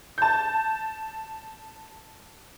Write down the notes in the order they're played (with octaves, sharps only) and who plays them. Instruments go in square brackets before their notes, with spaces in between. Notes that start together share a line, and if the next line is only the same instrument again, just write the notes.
[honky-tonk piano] A5 G6